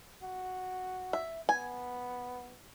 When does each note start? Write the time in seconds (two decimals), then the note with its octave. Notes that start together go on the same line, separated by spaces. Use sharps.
0.22 F#4
1.13 E5
1.49 B3 G#5